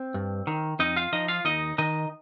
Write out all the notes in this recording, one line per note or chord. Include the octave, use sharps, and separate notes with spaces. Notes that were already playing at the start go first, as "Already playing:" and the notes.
Already playing: C4
G2
D#3
F2 D#4 D#5
F4 F5
F3 D#4 D#5
F4 F5
D#2 D#4 D#5
D#3 D#4 D#5